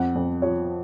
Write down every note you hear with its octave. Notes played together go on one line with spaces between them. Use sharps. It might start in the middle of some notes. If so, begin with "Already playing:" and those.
Already playing: F2 F#5
F2
F3 C#5